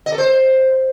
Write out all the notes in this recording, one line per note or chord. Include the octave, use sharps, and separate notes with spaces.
D#5
A4
C5